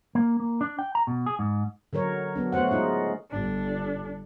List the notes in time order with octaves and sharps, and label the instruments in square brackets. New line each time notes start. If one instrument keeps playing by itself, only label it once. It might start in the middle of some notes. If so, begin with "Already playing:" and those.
[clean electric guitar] A#3
A#3
D4
G5
A#5
B2
G#4
G#2
[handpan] D3 F#3 A#4 C#5
F#3 B3 D4
A3 B3 F#4 C5 F#5
G#3 D#4 F4
[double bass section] G1 [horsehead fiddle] D4 A4